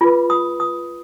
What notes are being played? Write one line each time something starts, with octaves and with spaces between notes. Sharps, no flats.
F4 G#4 B4 B5
D#6
D#6